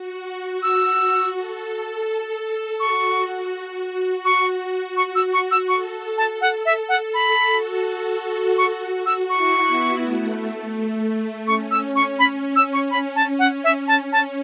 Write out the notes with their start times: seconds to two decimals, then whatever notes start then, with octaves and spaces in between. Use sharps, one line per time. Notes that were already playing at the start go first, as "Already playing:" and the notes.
Already playing: F#4
0.63 E6
1.35 A4
2.80 F#4 C#6
3.52 F#4
4.25 F#4 C#6
4.97 C#6
5.15 E6
5.33 C#6
5.51 E6
5.68 A4 C#6
6.18 A5
6.41 F#5
6.66 E5
6.89 F#5
7.13 A4 B5
7.50 F#4
8.58 C#6
9.06 E6
9.30 E4 C#6
9.67 B3
10.02 A3
11.46 C#4 C#6
11.71 E6
11.83 C#4
11.96 C#6
12.19 B5
12.56 E6
12.73 C#6
12.91 B5
13.16 A5
13.39 F#5
13.64 C#4 E5
13.88 A5
14.12 A5